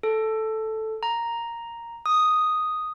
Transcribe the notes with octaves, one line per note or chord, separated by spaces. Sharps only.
A4
A#5
D#6